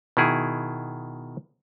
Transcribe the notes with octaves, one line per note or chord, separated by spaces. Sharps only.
B2 D#3 E4 G#4